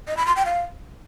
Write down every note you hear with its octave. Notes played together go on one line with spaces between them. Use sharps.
D#5
B5
C6
G5
F5